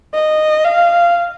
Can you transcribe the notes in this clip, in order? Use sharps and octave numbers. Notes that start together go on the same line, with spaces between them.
D#5
F5